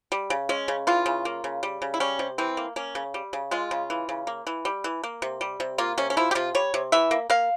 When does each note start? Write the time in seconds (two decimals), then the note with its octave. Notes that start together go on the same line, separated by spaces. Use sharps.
0.12 G3
0.30 C#3
0.49 G#3 C#4
0.68 C#3
0.87 E3 F4
1.06 C#3
1.25 A#3
1.44 C#3
1.63 G3
1.82 C#3
1.94 E4
2.00 G3 C#4
2.19 C3
2.38 E3 C4
2.57 A#3
2.76 A#3 C#4
2.95 C#3
3.14 G3
3.33 C#3
3.51 G#3 F4
3.71 C#3
3.90 E3
4.09 C#3
4.27 A#3
4.47 E3
4.65 G3
4.84 E3
5.04 A#3
5.22 C3
5.41 G3
5.60 C3
5.78 A#3 F4
5.98 C3 C#4
6.10 C#4
6.17 F3 E4
6.31 G4
6.35 C3 F4
6.55 G3 C#5
6.74 C3
6.92 E3 E5
7.11 A#3
7.30 A#3 F5